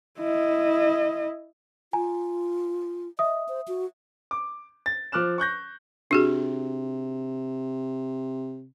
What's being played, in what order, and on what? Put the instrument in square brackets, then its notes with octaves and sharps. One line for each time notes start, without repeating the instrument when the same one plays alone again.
[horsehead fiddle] E4 D#5
[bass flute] F4 [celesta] G#5 A#5
[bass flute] D#5 [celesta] E5 D#6
[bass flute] C5
F#4
[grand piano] D6
A6
F3 D6 F6 F#6 E7
C#6 F#6 G6 A#6
[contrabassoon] C3 [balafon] D4 F#4 G#4